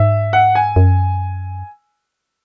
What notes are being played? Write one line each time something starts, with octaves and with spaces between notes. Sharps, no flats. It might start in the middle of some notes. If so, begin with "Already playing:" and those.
Already playing: G#2 E5
F#5
G#5
F#2